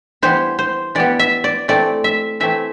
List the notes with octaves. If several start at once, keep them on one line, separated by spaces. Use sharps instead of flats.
E3 G3 B3 C5
C5
E3 G3 B3 D5
E5
D5
E3 A3 C4 D5
E5
E3 A3 C4 E5